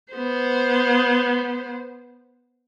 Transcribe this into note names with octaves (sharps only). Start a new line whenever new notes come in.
B3 C5